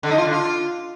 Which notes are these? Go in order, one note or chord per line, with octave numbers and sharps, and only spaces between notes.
D3
D#4
F4
D3
F4